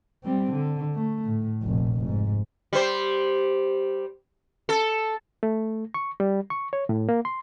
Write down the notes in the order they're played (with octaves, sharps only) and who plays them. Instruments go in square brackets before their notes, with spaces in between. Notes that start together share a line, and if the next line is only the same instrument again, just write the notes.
[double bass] G3 C4
D3
A3
A2
F1 A#1
G#2
[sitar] G3 C5
A4
[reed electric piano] A3
C#6
G3
C#6
C#5
A2
A#3
C6